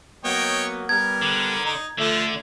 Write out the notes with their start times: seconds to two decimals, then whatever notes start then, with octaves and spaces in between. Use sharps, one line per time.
0.24 F#3 A#3 B3 C#5 D#5 G5
0.89 G3 B3 A#4 G#6
1.22 D3
1.65 D#4
1.98 D3 F3 A3